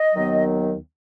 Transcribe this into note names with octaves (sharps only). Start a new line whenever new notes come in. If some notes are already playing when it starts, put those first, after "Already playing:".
Already playing: D#5
D#2 D#3 F#3 B3